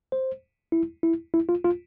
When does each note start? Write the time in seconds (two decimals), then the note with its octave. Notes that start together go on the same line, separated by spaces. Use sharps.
0.12 C5
0.72 E4
1.03 E4
1.34 E4
1.49 F4
1.64 F4